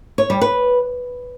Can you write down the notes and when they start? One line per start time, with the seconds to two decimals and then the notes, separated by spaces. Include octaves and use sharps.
0.18 C#5
0.30 G3
0.41 B4